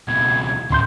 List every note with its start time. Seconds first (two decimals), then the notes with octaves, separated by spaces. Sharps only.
0.08 C#2 B2 G#6
0.70 D2 A2 C#3 C6 G6